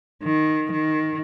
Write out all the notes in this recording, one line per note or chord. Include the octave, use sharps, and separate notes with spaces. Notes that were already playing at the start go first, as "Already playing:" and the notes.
D#3
D#3